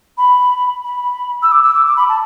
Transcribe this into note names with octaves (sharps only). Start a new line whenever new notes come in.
B5
B5
E6
D6
E6
D6
D6
B5
A5